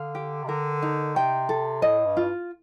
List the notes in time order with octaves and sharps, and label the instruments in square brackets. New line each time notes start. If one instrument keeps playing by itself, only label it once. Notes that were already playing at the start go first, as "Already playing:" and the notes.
Already playing: [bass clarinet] D3 [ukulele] F5
[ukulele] G4
[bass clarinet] C3
[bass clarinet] D3 [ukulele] A#4
[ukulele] D#4
[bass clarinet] C3 [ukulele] G5
[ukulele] A4
[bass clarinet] A2 [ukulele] D#5
[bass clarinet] G2
[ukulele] F4